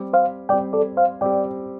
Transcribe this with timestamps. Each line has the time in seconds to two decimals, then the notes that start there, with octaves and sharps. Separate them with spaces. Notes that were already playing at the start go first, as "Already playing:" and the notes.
Already playing: G3 C4 G4
0.13 C5 F5
0.49 G3 C4 G4 D5 G5
0.73 A4 D5
0.97 C5 F5
1.21 G3 C4 G4 D5 G5